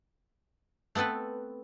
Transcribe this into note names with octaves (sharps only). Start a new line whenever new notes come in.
A3 B3 C4 A4 B4